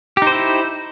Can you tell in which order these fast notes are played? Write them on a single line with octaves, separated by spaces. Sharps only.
G4 D#4 C5 E4